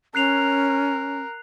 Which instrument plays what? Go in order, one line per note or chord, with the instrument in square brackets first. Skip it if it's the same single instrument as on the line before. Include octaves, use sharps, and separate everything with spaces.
[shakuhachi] C#4 [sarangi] A#4 [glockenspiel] F#6 C7 F7